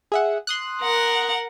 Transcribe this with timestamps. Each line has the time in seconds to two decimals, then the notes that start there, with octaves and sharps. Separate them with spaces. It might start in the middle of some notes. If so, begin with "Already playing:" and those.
0.12 G#4 E5 F#5
0.47 C6 D#6 F#6
0.82 A#4 F#5